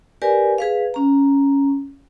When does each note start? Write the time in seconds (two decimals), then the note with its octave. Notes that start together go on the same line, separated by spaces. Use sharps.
0.22 G4 A#4 B4 D5 G#5
0.58 G#4 B4 F5
0.94 C#4 A#5